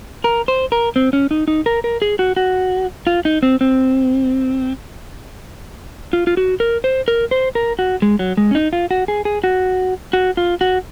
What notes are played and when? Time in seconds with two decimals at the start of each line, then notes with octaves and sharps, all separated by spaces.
0.24 A#4
0.48 C5
0.72 A#4
0.96 C4
1.13 C#4
1.31 D#4
1.48 D#4
1.66 A#4
1.84 A#4
2.02 G#4
2.19 F#4
2.36 F#4
3.07 F4
3.25 D#4
3.43 C4
3.61 C4
6.13 F4
6.27 F4
6.37 F#4
6.60 A#4
6.84 C5
7.08 A#4
7.31 C5
7.55 A#4
7.79 F#4
8.02 G#3
8.19 F#3
8.37 G#3
8.51 C#4
8.55 D#4
8.73 F4
8.91 F#4
9.08 G#4
9.25 G#4
9.44 F#4
10.13 F#4
10.37 F4
10.61 F#4